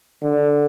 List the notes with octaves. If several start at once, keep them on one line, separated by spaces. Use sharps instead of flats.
D3